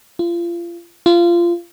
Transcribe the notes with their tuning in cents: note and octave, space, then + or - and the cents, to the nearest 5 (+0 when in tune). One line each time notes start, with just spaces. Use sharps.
F4 -30
F4 -20